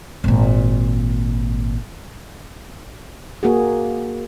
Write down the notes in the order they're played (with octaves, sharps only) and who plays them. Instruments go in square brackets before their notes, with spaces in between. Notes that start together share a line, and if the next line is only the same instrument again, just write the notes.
[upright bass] G#1 A#2
[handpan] A#3 F#4 G#4